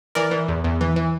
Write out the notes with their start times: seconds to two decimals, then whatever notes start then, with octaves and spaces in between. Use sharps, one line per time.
0.15 E3 A#4 D5
0.31 E3
0.48 E2
0.64 E2
0.81 E3
0.96 E3